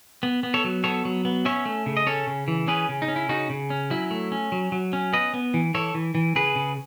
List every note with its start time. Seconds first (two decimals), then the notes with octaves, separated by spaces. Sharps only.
0.23 B3
0.43 B3
0.54 A4 C#5
0.64 F#3
0.84 B3 A4 C#5
1.05 F#3
1.25 B3
1.45 C#4 C#5 E5
1.66 A3
1.86 C#3
1.97 D#5
2.07 C#4 A4 C#5
2.27 C#3
2.48 E3
2.68 C#4 G#4 B4
2.89 C#3
3.02 D#4
3.08 C#4
3.16 E4
3.29 C#3 D#4 F#4
3.50 C#3
3.70 C#4
3.90 F#3 E4
4.11 A3
4.32 C#4
4.52 F#3
4.72 F#3
4.93 C#4
5.13 B3 B4 D#5
5.34 B3
5.54 E3
5.74 E3 A4 C#5
5.95 E3
6.15 E3
6.36 C#3 G#4 B4
6.56 C#3